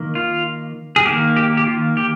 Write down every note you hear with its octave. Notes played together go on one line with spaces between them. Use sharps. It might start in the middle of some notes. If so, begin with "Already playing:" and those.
Already playing: D#3 A#3
F4
G#4
D#3 A#3 G4
G4
G4
F4
G4